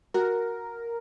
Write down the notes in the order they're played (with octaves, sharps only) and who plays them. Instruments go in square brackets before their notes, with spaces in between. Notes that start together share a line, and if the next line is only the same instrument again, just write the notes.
[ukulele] F#4 [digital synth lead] A#4